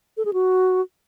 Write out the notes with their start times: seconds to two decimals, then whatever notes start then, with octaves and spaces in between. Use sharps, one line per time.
0.17 A4
0.25 G#4
0.33 F#4